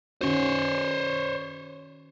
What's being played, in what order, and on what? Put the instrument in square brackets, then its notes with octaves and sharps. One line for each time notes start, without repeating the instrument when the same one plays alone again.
[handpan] D#3 C#4 F#4 [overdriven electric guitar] C5 C#5